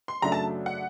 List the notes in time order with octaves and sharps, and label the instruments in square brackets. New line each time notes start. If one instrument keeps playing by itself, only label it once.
[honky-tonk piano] C6
[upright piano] F#2 C#3 F#3 A3 D4 [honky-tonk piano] A#5
[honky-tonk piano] A5
F#5